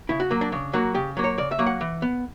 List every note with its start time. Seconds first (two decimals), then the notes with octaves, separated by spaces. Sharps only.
0.09 C#3 E4
0.20 F#4
0.31 F#3 A#3
0.41 D4
0.52 C#3 D4
0.73 F#3 A#3 F#4
0.94 C#3 G4
1.17 F#3 A#3
1.24 C#5
1.38 C#3 D5
1.51 E5
1.59 F#3 A#3
1.66 F#5
1.81 E3
2.02 B3